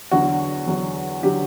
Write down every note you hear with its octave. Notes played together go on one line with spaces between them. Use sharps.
E2 D3 F#3 F#4
E2 D3 F#3
D3 F#3 G4